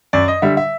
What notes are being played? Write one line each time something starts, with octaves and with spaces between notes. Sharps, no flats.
F#2 D5
D#5
D3 G3 E5
E5